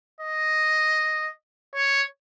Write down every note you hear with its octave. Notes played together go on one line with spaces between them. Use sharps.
D#5
C#5